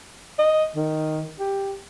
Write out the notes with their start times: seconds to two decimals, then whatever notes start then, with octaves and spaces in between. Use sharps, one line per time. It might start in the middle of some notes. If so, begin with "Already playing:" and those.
0.39 D#5
0.76 D#3
1.39 G4